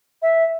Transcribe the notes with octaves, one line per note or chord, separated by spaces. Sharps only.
E5